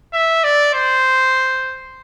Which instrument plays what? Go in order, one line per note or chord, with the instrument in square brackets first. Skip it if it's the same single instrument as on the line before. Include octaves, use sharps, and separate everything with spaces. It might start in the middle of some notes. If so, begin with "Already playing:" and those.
[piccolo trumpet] E5
D5
C5